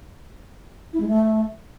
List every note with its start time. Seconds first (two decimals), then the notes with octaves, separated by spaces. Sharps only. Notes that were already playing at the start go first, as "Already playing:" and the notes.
0.93 E4
1.00 G#3
1.08 A3